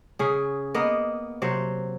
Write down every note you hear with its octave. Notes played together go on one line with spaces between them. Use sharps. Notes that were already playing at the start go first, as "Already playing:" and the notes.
C#3 G#4
A#3 B3 D#5
C3 F#3 C5